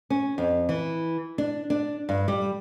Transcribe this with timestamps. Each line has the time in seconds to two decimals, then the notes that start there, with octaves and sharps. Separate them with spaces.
0.10 C#4
0.38 F2
0.69 E3
1.38 D4
1.70 D4
2.09 G2
2.28 G3